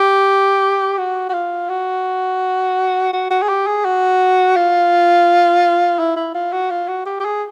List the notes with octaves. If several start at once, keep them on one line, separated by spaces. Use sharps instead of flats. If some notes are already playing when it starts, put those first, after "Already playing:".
Already playing: G4
F#4
F#4
F4
F#4
F#4
F#4
G#4
G4
G#4
F#4
F4
E4
E4
F4
F#4
F4
F#4
G4
G4
G#4